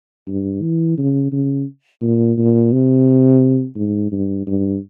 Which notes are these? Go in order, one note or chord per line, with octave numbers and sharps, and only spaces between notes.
G2
E3
C#3
C#3
A#2
A#2
C3
G#2
G2
G2